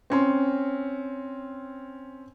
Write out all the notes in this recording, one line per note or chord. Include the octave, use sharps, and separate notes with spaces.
C4 C#4 C6